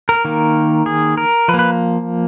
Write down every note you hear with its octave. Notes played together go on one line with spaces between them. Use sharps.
A#4
D#3 A#3
G#4
A#4
F3 B4
A#3
B4